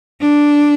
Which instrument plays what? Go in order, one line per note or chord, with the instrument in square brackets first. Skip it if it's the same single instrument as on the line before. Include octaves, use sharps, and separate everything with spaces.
[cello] D4